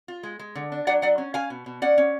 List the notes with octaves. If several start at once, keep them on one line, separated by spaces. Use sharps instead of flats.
F4
G#3
G#3
D3
D4
F#3 D5 F#5
F#3 D5 F#5
C#4
C#4 F5 G#5
B2
B2
C#4 D5 F#5
C#4